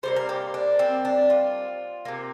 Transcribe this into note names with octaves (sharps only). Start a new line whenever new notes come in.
C3 G3 A#3 C5
A#4
G4
D4
C4
D4
F4
C3 A#3